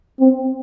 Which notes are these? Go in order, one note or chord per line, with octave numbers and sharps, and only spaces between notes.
C4